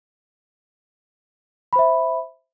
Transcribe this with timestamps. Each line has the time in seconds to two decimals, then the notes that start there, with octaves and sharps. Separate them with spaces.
1.73 B5
1.76 C5
1.79 E5